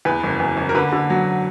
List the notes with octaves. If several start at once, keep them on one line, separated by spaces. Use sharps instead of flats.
E2 B4
F#1
E2
F#1
A#4
D3 B4
D3
F#3